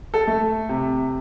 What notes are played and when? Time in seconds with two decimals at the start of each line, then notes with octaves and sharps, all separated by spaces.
0.14 A4
0.27 A3
0.69 C3